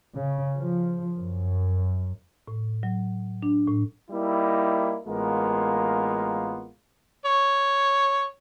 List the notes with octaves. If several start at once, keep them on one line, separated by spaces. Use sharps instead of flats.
C#3
F3
F#2
A2
F#3
D4
A2
G3 A#3 D#4 E4
A1 G#3 A#3 B3 F4 A#4
C#5